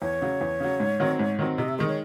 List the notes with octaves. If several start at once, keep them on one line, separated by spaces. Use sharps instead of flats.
E2 C#5
C#3 F#3
E2
C#3 F#3
G#2
D#3 F#3 C4
G#2
D#3 F#3 C4
C3 D#5
E5
D#3 G#3 D#5
C#5